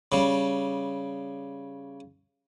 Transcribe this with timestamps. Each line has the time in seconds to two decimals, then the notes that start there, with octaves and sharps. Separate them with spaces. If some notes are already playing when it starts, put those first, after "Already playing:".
0.12 C#3 G3